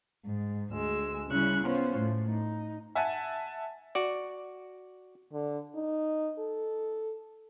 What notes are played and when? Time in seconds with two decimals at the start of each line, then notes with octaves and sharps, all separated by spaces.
0.24 G#2
0.72 D2 G#3 E6
1.28 C#3 G3 C#4 E4 C#6 F#6
1.63 B3 C#4 F4 C5 C#5
1.94 A2 A3
2.28 D#4
2.95 E5 F#5 G#5 A5
3.95 F#4 D5
5.33 D3
5.75 D#4
6.39 A4